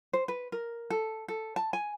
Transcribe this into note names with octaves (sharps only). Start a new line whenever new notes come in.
C5
B4
A#4
A4
A4
A5
G#5